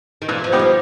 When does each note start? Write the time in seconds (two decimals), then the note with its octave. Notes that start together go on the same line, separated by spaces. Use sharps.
0.22 D#3
0.28 A#2 E3
0.44 F3
0.52 G3 B3 D#4 G4
0.59 F3